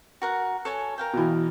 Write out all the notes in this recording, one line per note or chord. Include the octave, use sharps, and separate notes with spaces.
F#4 A#4 F#5
A4 C#5 G#5
A#4 F5 G5
B2 E3